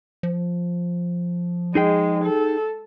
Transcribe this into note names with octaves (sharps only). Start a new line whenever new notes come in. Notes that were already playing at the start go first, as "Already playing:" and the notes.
F3
G#3 D#4 G#4 G5
A4